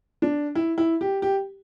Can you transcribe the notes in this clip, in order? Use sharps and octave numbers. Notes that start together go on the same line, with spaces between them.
D4
E4
E4
G4
G4